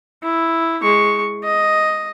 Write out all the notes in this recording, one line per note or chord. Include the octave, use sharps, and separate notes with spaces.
E4
G#3 C#6
D#5